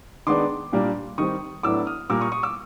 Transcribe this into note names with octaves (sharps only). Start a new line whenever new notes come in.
D#3 G#3 B3 D4 C6 D6
A#2 G3 A#3 D4
D#3 G3 C4 C#6 D#6
A2 F#3 B3 D4 D6 E6
D#6 F6
A#2 G3 A#3 D6 E6
C#6 D#6
C#6 D#6
D6 E6